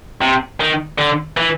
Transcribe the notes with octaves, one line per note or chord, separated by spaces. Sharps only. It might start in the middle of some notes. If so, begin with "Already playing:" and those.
C3
D#3
D3
E3